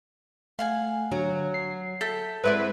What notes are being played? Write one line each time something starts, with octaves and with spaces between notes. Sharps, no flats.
A3 F5 F#5 G#5
D3 F#3
C7
A4 E5 G6 B6
G#3 C4 E4 B4 D5 F#5